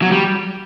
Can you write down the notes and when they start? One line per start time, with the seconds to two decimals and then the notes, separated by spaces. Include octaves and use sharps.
0.02 F#3
0.11 G3